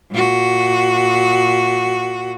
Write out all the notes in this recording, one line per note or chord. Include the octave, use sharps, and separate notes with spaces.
A#2 F#4